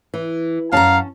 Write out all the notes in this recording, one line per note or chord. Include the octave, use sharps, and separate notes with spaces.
E3
F#2 C#4 F5 F#5 A5 A#5